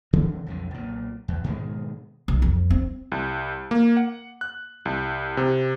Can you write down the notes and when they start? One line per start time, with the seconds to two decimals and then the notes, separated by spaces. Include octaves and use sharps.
0.13 C#3 E3 F3 C4
0.46 B1 F2 D3
0.71 B1 A#2
1.28 E2
1.44 G#2 B2 D#3 G#3
2.28 B1
2.42 F2
2.70 C4
3.12 C2
3.71 A#3
3.97 F#5
4.41 F#6
4.85 C2
5.37 C3